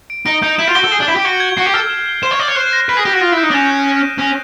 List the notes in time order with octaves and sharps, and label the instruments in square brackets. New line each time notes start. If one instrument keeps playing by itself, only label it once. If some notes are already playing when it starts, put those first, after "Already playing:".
[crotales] D7
[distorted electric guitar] D#4 [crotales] D7
[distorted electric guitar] D#4 [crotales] G6
[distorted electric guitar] E4 [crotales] E7
[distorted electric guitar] F4
[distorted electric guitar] F#4 [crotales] G7
[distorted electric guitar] A4
[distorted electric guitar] G#4 [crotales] G6
[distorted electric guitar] D4
[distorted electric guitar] E4 [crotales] G6
[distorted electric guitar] G4
[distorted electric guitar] F#4 [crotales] G#6
[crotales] G#6
[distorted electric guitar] F#4 [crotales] C7
[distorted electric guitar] G4
[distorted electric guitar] A4 [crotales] F6
[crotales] E7
G7
[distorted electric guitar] C5 [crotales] E7
[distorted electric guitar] C#5
[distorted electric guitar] D5 [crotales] G7
[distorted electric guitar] C#5
[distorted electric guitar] C5 [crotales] F#6
[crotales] A#6
[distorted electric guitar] B4 [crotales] D7
[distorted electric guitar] G#4
[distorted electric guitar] G4 [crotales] D7
[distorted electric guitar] F#4
[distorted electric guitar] F4 [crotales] D#6
[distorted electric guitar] E4 [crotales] G6
[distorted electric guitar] D#4
D4
[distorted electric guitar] C#4 [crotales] E7
[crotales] G6
D#7
D#7
[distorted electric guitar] C#4 [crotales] A#6